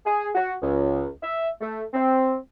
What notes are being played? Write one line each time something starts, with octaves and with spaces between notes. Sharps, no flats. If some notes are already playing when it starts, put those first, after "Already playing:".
G#4
F#4
C#2
E5
A3
C4